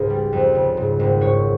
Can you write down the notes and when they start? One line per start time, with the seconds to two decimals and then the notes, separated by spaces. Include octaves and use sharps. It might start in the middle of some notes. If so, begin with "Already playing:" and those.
Already playing: C#2 G#2
0.10 G3
0.33 F2
0.55 C#3
0.77 G#2
0.99 G#1
1.21 G#2 C#5